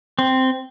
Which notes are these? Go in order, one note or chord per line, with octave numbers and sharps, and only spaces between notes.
C4